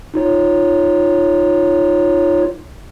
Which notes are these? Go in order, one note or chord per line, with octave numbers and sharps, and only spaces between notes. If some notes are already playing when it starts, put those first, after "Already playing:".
D#4 F4 C#5